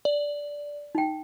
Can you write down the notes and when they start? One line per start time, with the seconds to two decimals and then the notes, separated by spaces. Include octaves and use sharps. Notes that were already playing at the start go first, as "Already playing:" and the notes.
0.05 D5
0.95 D#4 G5